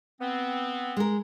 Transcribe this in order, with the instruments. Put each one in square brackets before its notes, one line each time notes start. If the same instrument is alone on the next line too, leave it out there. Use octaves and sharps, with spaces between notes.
[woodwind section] B3 C4
[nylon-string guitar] G#3 A#4